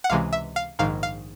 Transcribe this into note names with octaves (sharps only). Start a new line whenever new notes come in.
F#5
C#2 C3 E3 G#3 F5
E5
F5
A#1 G#2 D#3 F5
F5